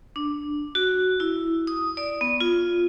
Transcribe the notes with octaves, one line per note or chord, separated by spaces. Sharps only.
D4
F#4
E4
D#6
D5
B3
F4